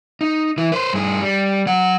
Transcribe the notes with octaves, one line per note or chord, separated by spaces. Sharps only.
D#4
E3 E4
B4 C5
G2 G#4
G3
F#3 F#5